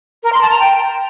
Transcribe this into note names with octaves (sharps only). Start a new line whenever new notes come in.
A#4
C6
A5
A#5
G5